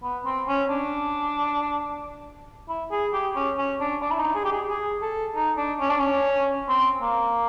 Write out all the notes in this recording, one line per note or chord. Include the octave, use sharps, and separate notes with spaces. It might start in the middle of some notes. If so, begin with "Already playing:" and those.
B3
C4
C#4
D4
E4
G#4
G4
C#4
C#4
D4
D4
E4
D#4
G#4
G4
G#4
G#4
A4
D#4
D4
C#4
D4
C#4
C4
A#3